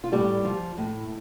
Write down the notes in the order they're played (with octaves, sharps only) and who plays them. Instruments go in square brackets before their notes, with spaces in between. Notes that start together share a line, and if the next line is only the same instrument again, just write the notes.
[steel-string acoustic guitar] F4
A2 G3 G4
F3
A2